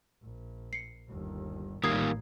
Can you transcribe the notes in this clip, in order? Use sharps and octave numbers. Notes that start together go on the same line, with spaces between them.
A#1
C7 C#7
G1 D#2
A1 D#3 G3 A#3 D#6 G#6 C7